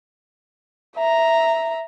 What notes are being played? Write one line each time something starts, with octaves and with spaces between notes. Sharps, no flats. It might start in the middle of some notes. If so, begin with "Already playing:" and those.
E5 A#5